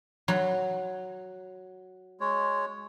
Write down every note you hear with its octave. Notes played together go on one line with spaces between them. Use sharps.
F#3
G#3 C#5